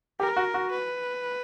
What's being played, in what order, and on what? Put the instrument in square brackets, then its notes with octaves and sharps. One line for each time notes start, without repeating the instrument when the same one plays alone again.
[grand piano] G4 [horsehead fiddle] A#4
[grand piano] F#4
F#4
[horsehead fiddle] B4